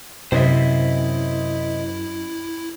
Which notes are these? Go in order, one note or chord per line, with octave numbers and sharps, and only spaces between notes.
F#2 C3 E4 C5 D#5 E5